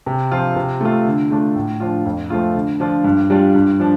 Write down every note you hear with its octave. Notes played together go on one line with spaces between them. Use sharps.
C3
F3 C4 F4
C3
A3 F4
D3
A3 D4 F4
A2
F3 D4 F4
F2
F3 A3 F4
D3
F3 D4 F4
G2
G3 D4 F4
G2
F3 D4